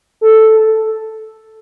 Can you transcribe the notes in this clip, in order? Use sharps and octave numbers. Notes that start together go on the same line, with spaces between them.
A4